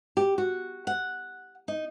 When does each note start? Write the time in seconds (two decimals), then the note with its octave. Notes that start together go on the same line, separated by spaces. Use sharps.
0.17 G4
0.38 F#4
0.87 F#5
1.68 D#4